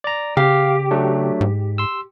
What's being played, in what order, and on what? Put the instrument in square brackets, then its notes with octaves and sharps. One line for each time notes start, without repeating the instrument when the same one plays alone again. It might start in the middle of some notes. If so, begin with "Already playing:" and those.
[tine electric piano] D5 A#5
[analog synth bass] C#3 [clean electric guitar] G4 [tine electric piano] F5
[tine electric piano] F#3 A3 D4
[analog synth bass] G#2
[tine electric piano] C6 E6